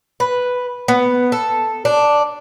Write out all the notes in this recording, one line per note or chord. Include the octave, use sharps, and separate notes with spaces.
B4
B3
A4
D4